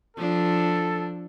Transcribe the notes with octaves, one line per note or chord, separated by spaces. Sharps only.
F3 D4 A4